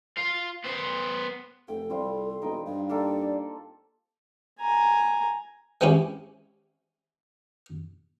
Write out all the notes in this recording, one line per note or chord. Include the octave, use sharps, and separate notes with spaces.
F4 F5
B3 C5
F1 A4 G5
C2 G3 C4 F4
E1 D#4 G5
G2 F5
A#3 G4 A4 D5
G#5 A#5
G#3 C4 C#4 E4 G4